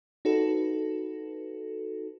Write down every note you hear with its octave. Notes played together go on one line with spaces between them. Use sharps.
D#4 F#4 A4 B4